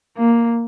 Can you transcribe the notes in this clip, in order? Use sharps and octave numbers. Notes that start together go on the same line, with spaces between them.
A#3